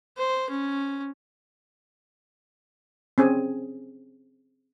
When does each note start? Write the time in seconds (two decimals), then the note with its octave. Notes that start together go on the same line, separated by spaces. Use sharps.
0.17 C5
0.50 C#4
3.18 C4 C#4 G#4 G#5